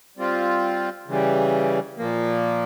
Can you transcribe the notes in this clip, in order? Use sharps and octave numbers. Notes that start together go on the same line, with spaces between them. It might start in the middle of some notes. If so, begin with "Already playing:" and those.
G3 C4 F4
C#3 E3 G3
A#2 F3 A#3